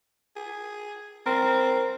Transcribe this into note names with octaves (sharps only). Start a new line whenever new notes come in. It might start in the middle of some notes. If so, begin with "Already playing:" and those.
G#4
C4 A#4